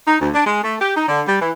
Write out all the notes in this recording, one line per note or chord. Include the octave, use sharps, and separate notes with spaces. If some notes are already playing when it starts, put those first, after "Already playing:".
D#4
D2
D4
G#3
A3
G4
D#4
D3
G3
E3